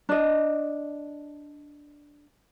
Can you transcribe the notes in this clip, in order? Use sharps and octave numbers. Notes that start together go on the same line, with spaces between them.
D4 D#5